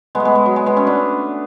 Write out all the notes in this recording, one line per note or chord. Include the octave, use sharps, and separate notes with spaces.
G#3 B3
A3
G#3 B3
G#3
F#3
G#3
G#3 B3
A3 C#4
B3 D4